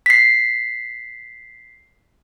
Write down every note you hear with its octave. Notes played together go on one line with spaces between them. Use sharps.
B6 C7